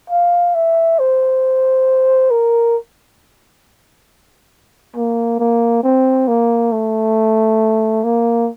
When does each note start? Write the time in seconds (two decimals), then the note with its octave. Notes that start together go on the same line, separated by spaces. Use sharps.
0.10 F5
0.55 E5
0.99 C5
2.31 A#4
4.96 A#3
5.40 A#3
5.83 C4
6.28 A#3
6.72 A3
8.04 A#3